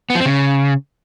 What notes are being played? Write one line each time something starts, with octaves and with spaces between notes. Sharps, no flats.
B3
F3
C4
C#3